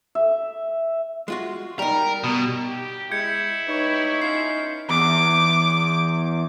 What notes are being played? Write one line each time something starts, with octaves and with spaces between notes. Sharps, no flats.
E5
G#3 F4 F#4
G3 D#4 A#4
B2
G4
G#3 E4 G6 G#6 C#7
D#4 G4 B4 C#5
C#4 F4 C7
E2 D6